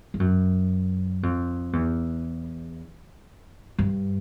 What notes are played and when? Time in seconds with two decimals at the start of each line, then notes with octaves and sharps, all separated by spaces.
0.14 G2
0.20 F#2
1.23 F2
1.73 E2
3.78 G2